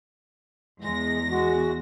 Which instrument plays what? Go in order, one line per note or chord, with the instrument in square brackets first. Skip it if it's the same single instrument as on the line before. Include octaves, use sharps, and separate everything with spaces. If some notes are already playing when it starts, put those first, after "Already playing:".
[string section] E2 A#6 [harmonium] G#3
[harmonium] G#3 F#4